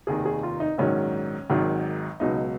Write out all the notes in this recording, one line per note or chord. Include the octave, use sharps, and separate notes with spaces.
F1 D#2 D#3 G#4
G#4
F4
D#4
A#1 G#2 D#3 F#3 C#4
G#1 G#2 D#3 F#3
C#2 B2 F#3 D#4